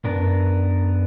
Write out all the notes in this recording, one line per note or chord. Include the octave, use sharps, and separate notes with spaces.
F#2 B3 D4 A#4